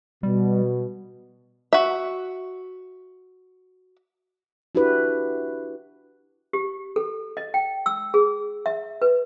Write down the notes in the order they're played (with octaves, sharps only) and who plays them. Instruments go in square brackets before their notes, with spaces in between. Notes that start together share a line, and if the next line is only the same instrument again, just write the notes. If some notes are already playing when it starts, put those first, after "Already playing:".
[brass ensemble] B2 [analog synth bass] G3
[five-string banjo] F#4 E5
[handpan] D4 E4 F#4 G4 B4
[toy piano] G4
A4
D#5
G5
E6
G#4
E5
B4